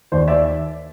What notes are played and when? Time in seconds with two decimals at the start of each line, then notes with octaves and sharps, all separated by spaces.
0.12 D#2 C5 D5
0.28 D5 E5